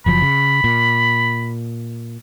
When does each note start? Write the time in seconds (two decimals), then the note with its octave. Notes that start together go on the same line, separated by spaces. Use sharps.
0.06 F#1 F3 F#3 B5
0.22 C#3
0.64 A#2